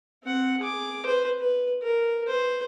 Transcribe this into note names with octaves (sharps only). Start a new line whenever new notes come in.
C4 F#5
G#4 D6
B4 C5
B4
A#4
B4 C5